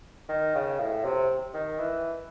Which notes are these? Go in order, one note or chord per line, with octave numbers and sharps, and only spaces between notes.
D#3
C#3
A2
C3
D#3
E3